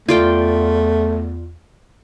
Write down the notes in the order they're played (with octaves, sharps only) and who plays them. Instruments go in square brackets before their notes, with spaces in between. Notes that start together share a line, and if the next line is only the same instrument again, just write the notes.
[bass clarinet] E2 [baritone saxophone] A3 [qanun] F4 D5 G5